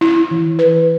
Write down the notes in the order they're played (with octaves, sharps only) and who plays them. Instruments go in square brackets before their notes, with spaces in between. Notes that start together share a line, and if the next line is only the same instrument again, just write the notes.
[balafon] E4
E3
B4